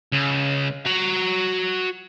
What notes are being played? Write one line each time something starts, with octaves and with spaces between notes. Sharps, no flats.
C#2
F#4 A#5